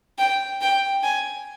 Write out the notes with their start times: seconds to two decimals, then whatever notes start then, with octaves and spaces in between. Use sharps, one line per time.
0.18 G5
0.61 G5
1.03 G#5